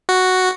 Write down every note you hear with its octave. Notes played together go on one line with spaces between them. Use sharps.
F#4